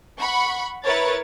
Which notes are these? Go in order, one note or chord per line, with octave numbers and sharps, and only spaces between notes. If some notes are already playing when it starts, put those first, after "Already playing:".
F#5 B5 C#6
E4 A#4 B4 C#5 A6